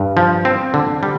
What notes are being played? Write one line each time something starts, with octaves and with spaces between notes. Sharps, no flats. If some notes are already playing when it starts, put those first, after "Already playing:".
Already playing: G2
F3
C4
D3
G3